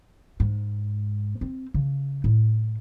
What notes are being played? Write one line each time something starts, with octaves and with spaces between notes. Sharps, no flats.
G#2
C4
C#3
A2